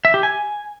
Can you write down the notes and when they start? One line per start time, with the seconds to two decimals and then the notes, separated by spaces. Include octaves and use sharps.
0.05 E5
0.14 G4
0.23 G#5